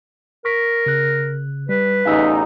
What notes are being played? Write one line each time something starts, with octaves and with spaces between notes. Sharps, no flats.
A#4 C#6 B6
C#3 F#6
G3 B4
A1 E2 D#4 F5 G#5 E6